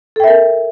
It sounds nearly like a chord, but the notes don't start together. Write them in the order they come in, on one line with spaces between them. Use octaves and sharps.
A4 G5 E5 A#4